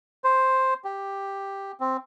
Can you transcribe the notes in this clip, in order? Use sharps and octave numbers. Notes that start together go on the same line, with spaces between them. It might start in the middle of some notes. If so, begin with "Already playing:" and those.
C5
G4
C4